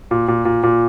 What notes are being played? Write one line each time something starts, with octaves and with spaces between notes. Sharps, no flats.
A#2
A#2
A#2
A#2